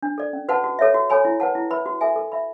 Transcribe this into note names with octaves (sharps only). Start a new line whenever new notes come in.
D4
A4 D5
C#4
F#4 B4 F#5 A5
F#4
A4 C#5 E5
F#4
A4 C#5 G#5 B5
E4
B4 F#5 A5
E4
B4 E5 B5
F#4
A4 E5 G#5
A4
E5 B5